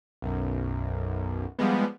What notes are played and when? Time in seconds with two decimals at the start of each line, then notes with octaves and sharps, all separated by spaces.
0.22 B1 F#2
1.59 F3 G3 G#3 B3